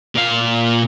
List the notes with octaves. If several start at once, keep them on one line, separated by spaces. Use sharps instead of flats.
A#2 F5